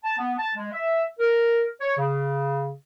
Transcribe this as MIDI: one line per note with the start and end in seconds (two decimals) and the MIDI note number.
0.04 0.16 81
0.19 0.33 59
0.38 0.50 81
0.56 0.71 56
0.73 1.03 76
1.20 1.65 70
1.81 1.95 73
1.97 2.75 49